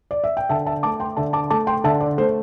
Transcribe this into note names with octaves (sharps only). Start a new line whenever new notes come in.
D5
E5
G5
D3 E5 A5
E5 A5
A3 A5 D6
G5 C6
D3 E5 A5
A5 D6
A3 A5 D6
G5 C6
D3 E5 A5
D5
A3 C5